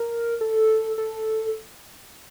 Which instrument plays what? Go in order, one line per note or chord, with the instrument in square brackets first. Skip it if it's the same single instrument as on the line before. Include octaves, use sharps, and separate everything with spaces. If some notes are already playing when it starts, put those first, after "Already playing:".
Already playing: [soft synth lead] A#4
A4
A4